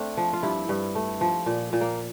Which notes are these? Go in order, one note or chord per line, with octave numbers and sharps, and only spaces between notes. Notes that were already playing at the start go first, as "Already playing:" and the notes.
Already playing: A3 C4 D4
F3
F4
G2 E4
G2
A3
F3
A#2
A#2
A#3